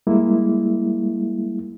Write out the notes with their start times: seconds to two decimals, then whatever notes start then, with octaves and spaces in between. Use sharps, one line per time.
0.07 G3 G#3 A#3 E4